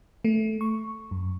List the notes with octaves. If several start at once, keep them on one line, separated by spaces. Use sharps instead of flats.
A3
C#6
F#2